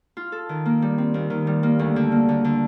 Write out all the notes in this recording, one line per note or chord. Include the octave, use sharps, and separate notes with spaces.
F4
A4
D#3
A#3
G3
C4
D#2
D#3
G3
A#3
D2
D3
A#3
D3
D3